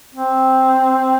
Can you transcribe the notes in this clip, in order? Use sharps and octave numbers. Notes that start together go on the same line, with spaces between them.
C4